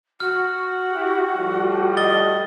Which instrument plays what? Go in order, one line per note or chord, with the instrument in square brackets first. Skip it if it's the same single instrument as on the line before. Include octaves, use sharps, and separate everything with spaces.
[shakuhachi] F#4 [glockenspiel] F6
[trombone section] E4 G4
A2 F3 G3
[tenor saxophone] D#5 [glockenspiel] A6 G7